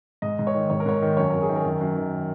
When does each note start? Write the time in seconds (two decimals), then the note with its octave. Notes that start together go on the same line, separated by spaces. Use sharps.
0.22 G#2 D#5
0.39 G#2
0.47 C#5
0.55 D#3
0.70 G#2 C#5
0.80 A#4
0.86 G#2 C#5
1.02 D#3
1.17 F#2 C#5
1.30 F#2 A#4
1.42 G#4
1.49 D#3
1.55 A#4
1.65 F#2
1.81 F#2
1.96 D#3